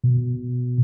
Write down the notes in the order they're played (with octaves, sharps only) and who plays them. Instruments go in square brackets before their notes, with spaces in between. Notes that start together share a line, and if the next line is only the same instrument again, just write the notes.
[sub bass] B2